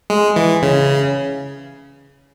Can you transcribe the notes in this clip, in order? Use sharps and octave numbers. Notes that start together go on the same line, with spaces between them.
G#3
E3
C#3